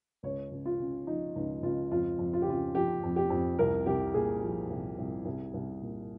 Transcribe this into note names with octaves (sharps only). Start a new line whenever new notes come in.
C#2 C#5
C#2
F4
C#3
F3 D#4
C#2 D#4
C#2 F4
F2 F4
F2
F4
G4
C#3 F4
F3 G4
F2
G4
F2
C2 A#4
C2 G4
A#2 G#4
F3
C2
C2
C2
C2
A#2